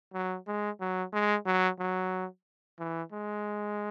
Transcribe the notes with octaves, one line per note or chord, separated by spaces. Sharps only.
F#3
G#3
F#3
G#3
F#3
F#3
E3
G#3